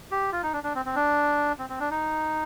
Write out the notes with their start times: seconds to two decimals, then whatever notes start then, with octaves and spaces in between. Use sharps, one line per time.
0.11 G4
0.32 F4
0.43 D#4
0.53 D4
0.64 D4
0.75 C4
0.86 C4
0.96 D4
1.59 C4
1.70 C4
1.80 D4
1.91 D#4